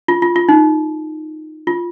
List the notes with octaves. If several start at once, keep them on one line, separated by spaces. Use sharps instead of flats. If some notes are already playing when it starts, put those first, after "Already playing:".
F4
F4
F4
D#4
F4